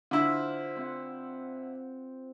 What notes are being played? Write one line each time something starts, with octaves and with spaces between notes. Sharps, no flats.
D3 E4 F4 C5
C4 F#5